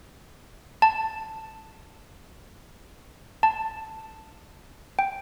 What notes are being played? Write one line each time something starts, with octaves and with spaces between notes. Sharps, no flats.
A5
A5
G5